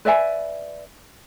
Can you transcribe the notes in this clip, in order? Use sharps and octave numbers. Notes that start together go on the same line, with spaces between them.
B4 D5 E5 G#5